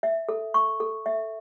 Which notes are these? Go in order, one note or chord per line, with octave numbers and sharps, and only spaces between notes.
E5
A4
C#6
A4
E5